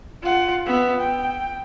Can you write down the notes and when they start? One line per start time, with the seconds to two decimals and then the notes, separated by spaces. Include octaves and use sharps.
0.22 F4 F#5
0.66 B3 E5
0.99 G5